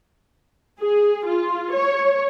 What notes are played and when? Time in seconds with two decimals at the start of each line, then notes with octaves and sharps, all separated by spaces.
0.80 G#4
1.26 F4
1.74 C#5